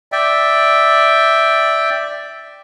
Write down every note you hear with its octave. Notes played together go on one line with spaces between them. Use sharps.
D5 E5 G5